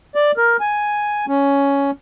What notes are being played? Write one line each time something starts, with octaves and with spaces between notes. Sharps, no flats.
D5
A#4
G#5
C#4